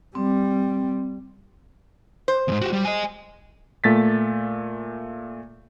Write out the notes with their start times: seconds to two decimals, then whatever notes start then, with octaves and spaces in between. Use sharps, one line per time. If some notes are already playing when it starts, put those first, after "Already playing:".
0.15 G3 C4
2.28 C5
2.48 E2 G#2
2.61 F#4 G4
2.73 G3
2.85 D#5 G#5
3.84 A#2 A3 A6 B6